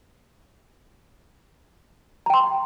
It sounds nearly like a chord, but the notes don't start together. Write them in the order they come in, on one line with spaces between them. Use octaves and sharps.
A#5 G5 C6